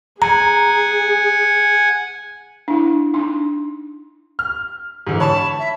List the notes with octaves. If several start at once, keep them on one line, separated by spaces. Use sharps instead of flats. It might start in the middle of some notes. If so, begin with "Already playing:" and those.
G#4 F#5 G#5 A#5
D4 E4
D4 D#4
F6
G#2 D3 E3
C#5 A5 B5 C#6
E5